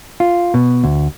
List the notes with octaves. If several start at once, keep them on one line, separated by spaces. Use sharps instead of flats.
F4
B2
D2